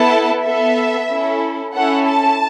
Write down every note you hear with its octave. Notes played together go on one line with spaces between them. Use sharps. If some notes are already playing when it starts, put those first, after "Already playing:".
Already playing: B3 E4 A4 A5
B3 A4 E5
C#4 E4 A4
C#4 E4 A4 F#5
A5